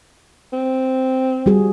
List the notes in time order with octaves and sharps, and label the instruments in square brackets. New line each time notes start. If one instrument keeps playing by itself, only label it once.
[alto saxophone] C4
[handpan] G3 F#4 G#4